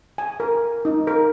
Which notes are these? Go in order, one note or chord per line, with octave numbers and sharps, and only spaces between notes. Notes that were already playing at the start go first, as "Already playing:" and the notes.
G#5
A#4
D#4
A#4